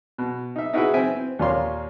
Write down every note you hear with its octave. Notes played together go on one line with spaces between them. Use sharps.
B2
D#4 E5
D#4 E4 F#4 G#4 B4 E5
C4 E4 E5 G#5
C4
D#2 A#2 F4 C#5 C6